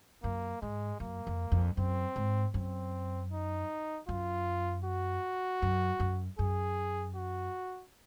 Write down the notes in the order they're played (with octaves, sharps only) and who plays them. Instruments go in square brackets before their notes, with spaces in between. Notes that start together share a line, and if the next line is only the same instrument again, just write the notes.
[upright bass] F#2 [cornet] A#3
[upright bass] G#2 [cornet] G#3
[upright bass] F#2 [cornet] A#3
[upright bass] F2
F2
[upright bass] F#2 [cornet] C4
[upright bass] G#2
[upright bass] F#2 [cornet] C4
[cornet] D#4
[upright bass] F#2 [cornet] F4
[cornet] F#4
[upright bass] F#2
F#2
[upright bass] F#2 [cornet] G#4
[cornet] F#4